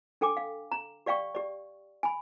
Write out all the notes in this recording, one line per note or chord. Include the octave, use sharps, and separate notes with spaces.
D4 A4 G5 G#5 D6
F5
A#5
G4 D5 F5 G5 C#6
G4 D5
G#5 B5